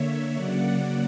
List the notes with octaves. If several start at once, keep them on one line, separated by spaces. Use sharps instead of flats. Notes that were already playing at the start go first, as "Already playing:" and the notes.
Already playing: D3 A#3 C#5 E5
C#3 F#3 A#3 D5 F#5